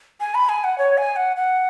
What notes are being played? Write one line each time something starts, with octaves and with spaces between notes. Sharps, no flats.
G#5
B5
G#5
F#5
C#5
G#5
F#5
F#5